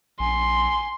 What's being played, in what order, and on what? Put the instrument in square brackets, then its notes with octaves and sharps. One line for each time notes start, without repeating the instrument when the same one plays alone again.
[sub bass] A#1 [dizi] G#5 [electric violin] C6